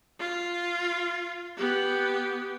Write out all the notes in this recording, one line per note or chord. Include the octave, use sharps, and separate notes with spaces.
F4
B3 G4